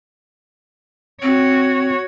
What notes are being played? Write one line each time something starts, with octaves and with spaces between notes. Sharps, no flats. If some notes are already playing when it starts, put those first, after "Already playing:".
C4 F#4 C#5